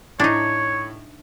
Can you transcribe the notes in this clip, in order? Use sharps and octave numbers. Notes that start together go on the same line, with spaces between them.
A2 D4 D#4 C#5